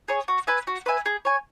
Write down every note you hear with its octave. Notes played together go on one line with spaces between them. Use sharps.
G#4 C#5
F#4
B4 E5 G#5
F#4
B4 E5 G#5
G#4
C#5 G#5